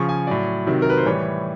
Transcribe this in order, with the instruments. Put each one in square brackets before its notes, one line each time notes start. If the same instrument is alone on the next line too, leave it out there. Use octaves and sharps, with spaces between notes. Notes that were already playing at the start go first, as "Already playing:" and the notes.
Already playing: [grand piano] C#3 F3 C#6
G#5
A2 F#3 D5
C3 D#3 F#3
A#4
B4
C5
A2 E3 G3 C#5